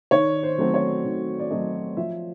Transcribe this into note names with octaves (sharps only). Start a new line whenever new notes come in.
D#3 C#5
C5
F#3 A3 C4
C#5
D#3
D5
F#3 A3 C4 D#5
F3 E5